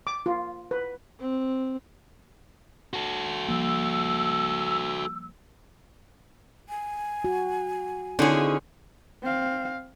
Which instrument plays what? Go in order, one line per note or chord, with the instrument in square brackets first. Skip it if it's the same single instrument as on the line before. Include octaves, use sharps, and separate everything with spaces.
[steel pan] D6
F4
B4
[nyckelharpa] C4
[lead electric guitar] F#4 A4
[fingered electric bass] F3 G3 A#3 [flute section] E6
[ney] G#5
[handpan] F#4
[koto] D3 C5 F#5 [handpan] C4 D#4 E4 [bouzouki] C#4 G#4
[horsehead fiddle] C4 F5